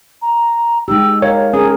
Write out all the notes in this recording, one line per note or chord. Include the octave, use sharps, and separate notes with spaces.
A#5
G#3 D#4 G4 E6
A#4 C#5 F5
C#4 G#4 A#4